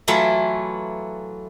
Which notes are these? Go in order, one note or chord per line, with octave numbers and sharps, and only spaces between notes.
E3 F#3 A3 E4 F4